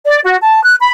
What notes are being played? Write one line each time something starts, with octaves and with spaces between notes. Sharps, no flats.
D5
F#4
A5
F#6
B5